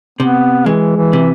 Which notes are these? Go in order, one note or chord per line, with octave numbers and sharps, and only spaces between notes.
C3 B3
E3 G#3
E3
C3